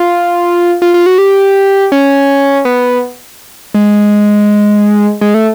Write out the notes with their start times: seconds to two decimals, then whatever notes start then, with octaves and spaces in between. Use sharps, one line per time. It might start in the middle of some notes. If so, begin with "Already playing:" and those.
Already playing: F4
0.82 F4
0.94 F4
1.06 F#4
1.18 G4
1.92 C#4
2.65 B3
3.74 G#3
5.21 G#3
5.34 A3